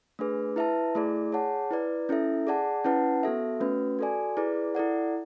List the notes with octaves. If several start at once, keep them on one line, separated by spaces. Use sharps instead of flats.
A3 D4 G#4 B4
E4 B4 E5 A5
A3 E4 G#4 D5
G#4 C#5 F#5 A5
E4 B4 D5
C#4 E4 A4 E5
G#4 D5 F#5 A5
C#4 E4 B4 F#5 A5
B3 F#4 A4 E5
A3 C#4 F#4 B4
F#4 A4 D5 G#5
E4 G#4 B4 D5
E4 A4 D5 F#5